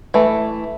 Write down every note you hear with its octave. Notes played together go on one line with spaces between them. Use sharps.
E3 A3